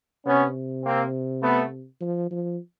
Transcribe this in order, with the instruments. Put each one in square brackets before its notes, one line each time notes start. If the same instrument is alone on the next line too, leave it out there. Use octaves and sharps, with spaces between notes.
[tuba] C3 [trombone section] B3 C#4
[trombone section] A#3 C4
A3 B3
[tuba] F3
F3